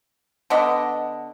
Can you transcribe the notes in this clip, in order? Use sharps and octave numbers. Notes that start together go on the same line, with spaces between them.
D3 B3 D#5